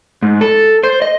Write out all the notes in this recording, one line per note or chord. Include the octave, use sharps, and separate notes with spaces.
G#2
A4
C5
D#5